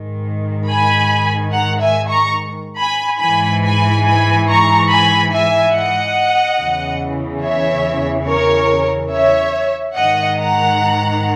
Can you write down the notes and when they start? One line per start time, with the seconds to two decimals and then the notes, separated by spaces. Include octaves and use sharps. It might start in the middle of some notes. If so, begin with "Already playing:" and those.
Already playing: G#2 D#3
0.68 G#5 B5
1.52 F#5 A#5
1.80 E5 G#5
2.09 A#5 C#6
2.79 G#5 B5
3.21 G#2 E3 G#5 B5
3.63 G#5 B5
4.06 G#5 B5
4.48 A#5 C#6
4.90 G#5 B5
5.32 E5 G#5
5.74 D#5 F#5
6.59 E2 C#3 E3
7.43 C#5 E5
8.27 A#4 C#5
9.12 C#5 E5
9.96 G#2 D#3 D#5 F#5
10.38 F#5 A#5